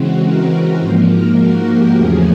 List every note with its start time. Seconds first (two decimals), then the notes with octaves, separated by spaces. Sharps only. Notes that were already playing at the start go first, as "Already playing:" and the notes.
Already playing: C#3 E3 G#3 C4 F#4
0.23 A#4
0.79 G#2 F3 A#3 C5
1.08 A#4
1.37 F#4
1.66 G4
1.94 E2 C#3 F3 A3 G#4